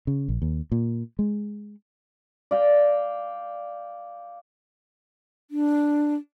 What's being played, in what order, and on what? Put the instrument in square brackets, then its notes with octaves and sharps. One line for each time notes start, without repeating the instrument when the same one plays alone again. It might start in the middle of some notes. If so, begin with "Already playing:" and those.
[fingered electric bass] C#3
A#1
D#2
A#2
G#3
[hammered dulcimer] D5 F5 G5
[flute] D4